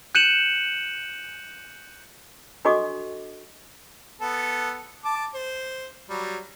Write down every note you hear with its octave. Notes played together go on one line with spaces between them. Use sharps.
F#6 G6 C#7 D#7 E7 F#7
D4 F#4 A4 D#5 C#6 D6
B3 A4
A5 D6
C5
F#3 G3